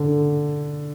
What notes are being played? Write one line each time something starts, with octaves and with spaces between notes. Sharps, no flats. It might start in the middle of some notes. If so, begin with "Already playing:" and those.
Already playing: D3